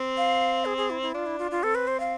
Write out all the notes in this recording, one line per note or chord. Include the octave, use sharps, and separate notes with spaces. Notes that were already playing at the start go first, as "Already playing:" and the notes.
Already playing: C4
F5
G#4
G#4
E4
E4
D4 F4
E4
F4
F4
C4 A4
B4
C5
F5